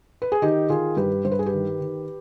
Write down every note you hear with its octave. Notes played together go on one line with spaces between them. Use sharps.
B4
G#4
D#3 D#4 G4
D#3 F4 G#4
G2 G4 B4
G2 C5
B4
G#4
G4 B4
D#3
D#3